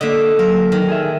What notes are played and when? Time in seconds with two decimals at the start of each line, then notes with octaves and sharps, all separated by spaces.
0.01 D3 A#3 D#5 E5
0.39 F#3 A#4
0.72 D#3
0.88 G#4 E5